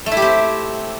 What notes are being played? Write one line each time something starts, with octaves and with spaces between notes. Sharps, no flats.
A3
E4
G4
C4